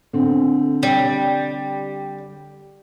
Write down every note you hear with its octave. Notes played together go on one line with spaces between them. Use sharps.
D3 C4
G3